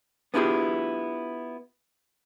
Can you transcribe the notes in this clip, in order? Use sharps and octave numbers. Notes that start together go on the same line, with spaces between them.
B3 D4 E4 F4 G4 G#4